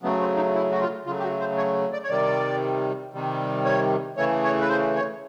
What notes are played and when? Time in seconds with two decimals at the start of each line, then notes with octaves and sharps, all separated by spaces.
0.02 C#3 F#3 A3 B3
0.20 C4
0.37 D#4
0.54 E4
0.71 F#4
0.80 F4
1.06 C#3 F#3 A3 F4
1.19 G4
1.23 F#4
1.40 C5
1.57 C#5
1.93 D5
2.04 C#5
2.09 C3 D#3 G3 D5
3.13 C3 D#3 G3
3.65 C#5
4.17 C#3 E3 A3 C#5
4.44 C#5
4.61 B4
4.69 C5
4.95 C#5